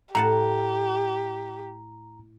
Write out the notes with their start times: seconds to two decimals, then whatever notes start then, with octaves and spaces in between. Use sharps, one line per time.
0.15 A2 G4 F#5 A5 A#5